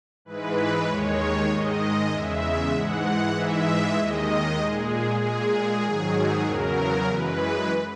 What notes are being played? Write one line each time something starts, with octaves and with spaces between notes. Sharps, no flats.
G#2 E3 G#3 B4
D#2 D#3 G#3 C#5
G#2 D#3 G#3 D#5
E2 C#3 G#3 E5
G#2 E3 G#3 F#5
G#2 E3 G#3 E5
D#2 D#3 G#3 D#5
A#2 G#3 G#4
A#2 G#3 G#4
G#2 D#3 F#3
E2 C#3 F#3 A#4
F#2 E3 G#3 B4